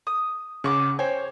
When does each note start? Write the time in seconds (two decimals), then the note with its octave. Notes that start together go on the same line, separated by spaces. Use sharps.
0.07 D#6
0.64 C#3 F#5 C#6 D6
0.99 C5 C#5 G5 G#5